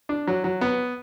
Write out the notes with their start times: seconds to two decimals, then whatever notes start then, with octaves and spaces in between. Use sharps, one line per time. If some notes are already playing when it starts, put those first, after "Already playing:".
0.09 D4
0.27 F#3
0.44 F#3
0.61 B3